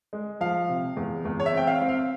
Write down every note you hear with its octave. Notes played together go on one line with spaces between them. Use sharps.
G#3
F3 F5
C3
E2
E2
C#5
E5
C4 G5
F5
C4
F5